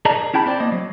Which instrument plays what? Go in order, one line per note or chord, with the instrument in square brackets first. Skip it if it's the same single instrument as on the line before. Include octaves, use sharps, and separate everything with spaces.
[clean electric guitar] G#4 A#4 D5 D#5 A5 A#5
G#4
C#4 E4 G5 A5 B5
C4 C5 D5
A#3 D#5
F#3